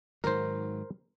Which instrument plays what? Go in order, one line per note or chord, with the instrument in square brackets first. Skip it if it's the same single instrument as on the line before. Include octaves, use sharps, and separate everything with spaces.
[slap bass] G#2 D#3 F#3 [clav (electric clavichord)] A#4 C5